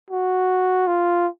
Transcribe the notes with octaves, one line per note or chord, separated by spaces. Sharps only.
F#4
F4